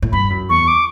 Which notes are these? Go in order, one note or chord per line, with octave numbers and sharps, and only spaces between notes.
A2
G2 B5
F#2
E2 C#6
D6